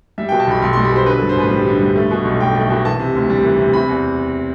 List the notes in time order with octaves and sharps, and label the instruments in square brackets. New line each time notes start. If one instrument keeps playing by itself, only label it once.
[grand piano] G3 E5
B2 G5
A5
B1 B5
B1 C6
G3 C6
B5
B2 C5
D3 B4
G2 A4
C5
A1 B4
G3
D3
G2
A3
B2
B1
B1 G5
A3
B2
E3 A5
C3
D2
G3
E3
C3
C3 B5
E2